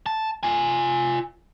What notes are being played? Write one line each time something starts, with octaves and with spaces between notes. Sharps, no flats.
A5
F4 G#5